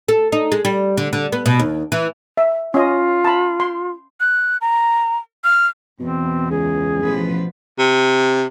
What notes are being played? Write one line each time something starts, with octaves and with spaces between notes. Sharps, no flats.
A4
D#4
G#3
G3
D3
D3
B3
B2
D#2
E3
E5
C#4 F4 D#5
A5 B5
C6
F#6
A#5
F6
E2 B2 C4
C#2 G#4
A1 B2 F3 B4
C3